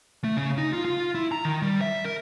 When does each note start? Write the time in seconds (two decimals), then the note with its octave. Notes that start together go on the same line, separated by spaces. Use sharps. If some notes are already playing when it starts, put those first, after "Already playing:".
0.24 A3
0.37 C#3
0.58 D#4
0.73 F4
0.85 F4
1.15 E4
1.32 A#5
1.45 D#3
1.62 G3
1.81 E5
2.05 A#4